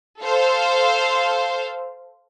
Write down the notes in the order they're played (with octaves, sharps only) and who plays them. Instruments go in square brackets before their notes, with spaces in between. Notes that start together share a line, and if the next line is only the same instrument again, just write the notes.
[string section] A4 C5 F5